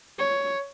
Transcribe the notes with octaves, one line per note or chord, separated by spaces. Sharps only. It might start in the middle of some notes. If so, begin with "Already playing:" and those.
C#5